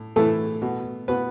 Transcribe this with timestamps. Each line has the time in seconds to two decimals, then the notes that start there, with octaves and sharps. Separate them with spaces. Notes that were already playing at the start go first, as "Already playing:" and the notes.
Already playing: A2
0.16 A2 E3 A3 A4
0.62 B2
1.08 B2 B3 B4